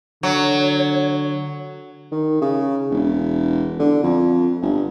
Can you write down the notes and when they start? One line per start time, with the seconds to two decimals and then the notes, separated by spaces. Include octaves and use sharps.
0.23 D3 F#3 C#5
2.12 D#3
2.42 C#3
2.90 E1
3.79 D3
4.03 F2
4.62 G1